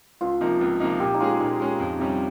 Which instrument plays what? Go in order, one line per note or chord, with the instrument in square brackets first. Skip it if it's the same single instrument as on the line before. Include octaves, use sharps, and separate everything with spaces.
[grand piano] C#2 [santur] F4
[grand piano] C3 F3 A#3 D#4
C#2
C3 F3 A#3 D#4
[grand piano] A#2 [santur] G4
[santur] D#4
[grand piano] G#3 C#4 G#4 [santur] F4
[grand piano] A#2 [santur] D#4
[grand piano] G#3 C#4 G#4
F2
C3 G3 C#4